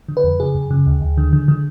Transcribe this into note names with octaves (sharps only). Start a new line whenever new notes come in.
D3
B4
F2
C#3 G#4
F#2
C#3
D2
D2
D3
D3
D3